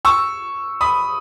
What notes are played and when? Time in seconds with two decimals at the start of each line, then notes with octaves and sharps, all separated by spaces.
0.05 C#6 E6
0.81 B5 D#6